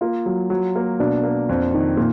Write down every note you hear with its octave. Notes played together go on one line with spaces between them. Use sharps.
A#3 F4
F#3
F#3
A#3
B2 D4
A#3
F2
D#3
A#2